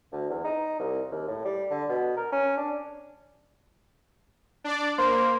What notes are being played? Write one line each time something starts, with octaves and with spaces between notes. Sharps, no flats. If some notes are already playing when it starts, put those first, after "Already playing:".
D2
E2
D#4
C2
D#2
A2
G3
D3
B2
A#4
C#4
D4
D4 D5
A#3 C5